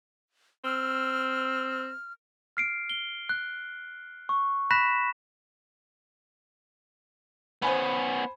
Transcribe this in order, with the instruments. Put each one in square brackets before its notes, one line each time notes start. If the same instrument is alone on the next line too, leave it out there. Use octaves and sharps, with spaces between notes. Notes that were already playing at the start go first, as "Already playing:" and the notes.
[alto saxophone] C4 [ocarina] E6 [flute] F6
[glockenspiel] F6 C7 D7
G7
F#6
C#6
B5 F#6 A#6 B6 E7
[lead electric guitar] B3 C#4 [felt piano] C5 G#5 B5